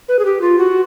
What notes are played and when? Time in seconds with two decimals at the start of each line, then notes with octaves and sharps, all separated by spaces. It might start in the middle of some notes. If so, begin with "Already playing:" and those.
0.08 B4
0.19 G#4
0.25 G4
0.41 F4
0.58 F#4